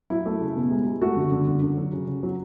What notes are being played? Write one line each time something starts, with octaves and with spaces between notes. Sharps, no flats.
F#3 E4
A3
C#3
B2
G#3
G#3
A3 F#4
D3
D3
D3
D3
F#3
C#3
C#3
F#3